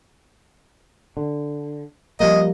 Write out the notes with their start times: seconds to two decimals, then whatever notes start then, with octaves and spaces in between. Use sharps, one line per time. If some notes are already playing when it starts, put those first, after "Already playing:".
1.17 D3
2.20 F3 G3 A#3 D#5